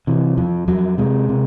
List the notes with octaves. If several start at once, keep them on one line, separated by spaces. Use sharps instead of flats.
C3 E3
F2 F3
F2 F#3
C3 G#3
C3